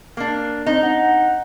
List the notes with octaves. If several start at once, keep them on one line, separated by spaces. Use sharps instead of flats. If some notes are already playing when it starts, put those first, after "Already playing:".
A#3 D4
C4 D#4
F#5